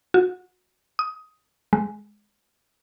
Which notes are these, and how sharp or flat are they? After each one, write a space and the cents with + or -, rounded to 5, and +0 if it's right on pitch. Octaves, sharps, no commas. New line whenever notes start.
F#4 -25
D#6 +15
G#3 +5